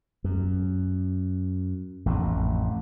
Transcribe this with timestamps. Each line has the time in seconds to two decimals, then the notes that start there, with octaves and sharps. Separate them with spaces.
0.24 F#2
2.06 A1 F2